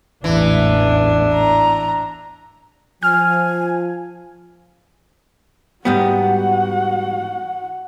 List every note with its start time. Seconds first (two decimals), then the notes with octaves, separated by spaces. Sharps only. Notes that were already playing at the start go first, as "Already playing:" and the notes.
0.24 A1 E2 G#2 E3 D4
1.33 A#5
3.03 F3 G#5 F6
5.85 G#2 G3 B3 F#4 F#5